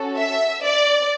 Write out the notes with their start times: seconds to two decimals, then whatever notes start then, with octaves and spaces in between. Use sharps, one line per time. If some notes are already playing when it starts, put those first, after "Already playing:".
Already playing: C#4 F#4 A4
0.16 E5
0.64 D5